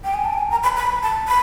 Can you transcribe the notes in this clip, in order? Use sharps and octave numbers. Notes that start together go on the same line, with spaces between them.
G5
G#5
A5
G5
G#5
A#5
B5
B5
A5
B5